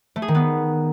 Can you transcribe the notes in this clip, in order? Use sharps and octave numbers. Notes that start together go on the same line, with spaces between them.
A3
G#4
D#3
B3